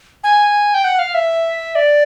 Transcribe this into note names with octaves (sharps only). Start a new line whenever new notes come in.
G#5
G5
F#5
F5
E5
D5